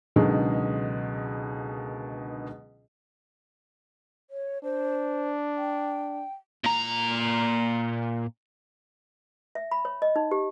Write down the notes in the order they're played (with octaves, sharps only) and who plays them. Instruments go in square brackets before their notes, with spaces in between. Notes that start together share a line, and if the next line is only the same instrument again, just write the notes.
[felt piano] C#2 B2 D3 D#3 F#3 G#3
[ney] C#5
[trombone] D4 [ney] C5
[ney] G5
[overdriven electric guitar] A#2 A#5
[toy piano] E5
B5
C#5
D#5
D#4
G4